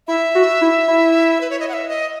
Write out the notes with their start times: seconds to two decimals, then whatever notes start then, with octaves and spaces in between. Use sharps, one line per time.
0.08 E4 E5
0.35 F#4
0.61 E4
0.88 E4
1.41 B4
1.50 C#5
1.60 D#5
1.69 F#5
1.73 E5
1.89 D#5